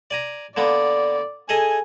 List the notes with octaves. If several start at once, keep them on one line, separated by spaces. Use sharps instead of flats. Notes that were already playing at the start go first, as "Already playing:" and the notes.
D5 G#5 A#5
D3 A#3 B3 D5
G#4 A4 D#5 G#5